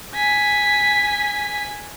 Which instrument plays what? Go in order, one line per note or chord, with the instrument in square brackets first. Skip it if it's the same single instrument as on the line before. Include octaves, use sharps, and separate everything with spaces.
[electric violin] G#5 B6